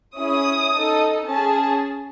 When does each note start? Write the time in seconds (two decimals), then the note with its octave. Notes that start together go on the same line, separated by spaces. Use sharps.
0.18 C#4 E4 G#4 D#6
0.73 D#4 A4
1.28 C#4 G#4 A5